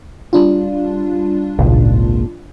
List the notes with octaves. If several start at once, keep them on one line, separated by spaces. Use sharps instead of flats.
G3 D4 F4
G#1 C#2 A#2